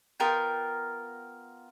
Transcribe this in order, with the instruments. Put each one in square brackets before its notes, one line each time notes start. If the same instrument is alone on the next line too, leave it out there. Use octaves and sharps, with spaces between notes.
[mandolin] B3 F4 A#4 G5